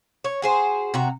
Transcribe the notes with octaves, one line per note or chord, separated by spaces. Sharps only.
C#5
F#4 G#4 C5
C3 F#4 A#5